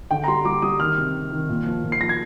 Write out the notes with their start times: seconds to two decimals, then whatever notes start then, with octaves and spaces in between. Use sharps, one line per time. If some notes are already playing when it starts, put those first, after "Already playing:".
0.11 D3 G5
0.24 A#5
0.28 G3 C6
0.45 G3 D6
0.62 G3 D#6
0.79 D#3 F6
0.97 C3
1.14 C3
1.32 D#3
1.49 A#2
1.66 F3
1.84 A#2
1.92 C7
2.01 F3 A#6
2.09 G#6